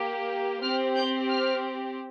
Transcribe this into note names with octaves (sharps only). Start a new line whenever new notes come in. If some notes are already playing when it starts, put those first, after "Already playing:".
Already playing: A#3 G4
C4 G4 F6
G6
F6